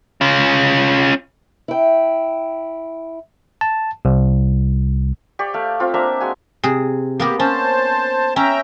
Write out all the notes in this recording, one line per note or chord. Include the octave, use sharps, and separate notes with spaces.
C#4 F4
E4 G5
A5
C2
G4 D5 C#6
A3 F5
C4 F4
A#3 D4 E5 A#5
G#3 F#4 G#5
C3 G#4
A#3 B3 G4 A#4
C#4 C5 A5
C#4 E5 G5 A#5